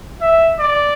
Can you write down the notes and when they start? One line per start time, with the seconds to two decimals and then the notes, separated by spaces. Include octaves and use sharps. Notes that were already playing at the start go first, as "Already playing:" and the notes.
0.21 E5
0.59 D5